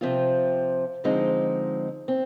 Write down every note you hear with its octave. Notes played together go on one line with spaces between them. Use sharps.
C3 F3 C4 F4
D3 F3 G#3 C4 D#4
C4